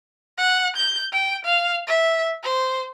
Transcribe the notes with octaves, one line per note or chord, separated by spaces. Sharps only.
F#5
G6
G5
F5
E5
C5